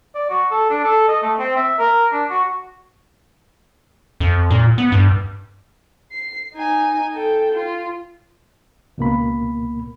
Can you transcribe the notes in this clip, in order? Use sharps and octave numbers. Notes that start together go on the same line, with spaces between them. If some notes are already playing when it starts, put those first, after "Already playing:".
D5
F#4
A4
D4
A4
D#5
A3
C4
E5
A#4
D4
F#4
F2
A#2
B3
G2
C7
D#4 G#5
A4 G5
F4
C#2 B2 A#3 B5